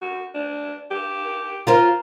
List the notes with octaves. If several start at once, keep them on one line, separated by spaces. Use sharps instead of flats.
F#4
D4
G4
F4 A#4 C5